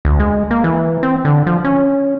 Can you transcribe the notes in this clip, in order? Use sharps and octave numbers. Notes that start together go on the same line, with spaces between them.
D2
G#3
A#3
E3
C4
D3
F3
C#4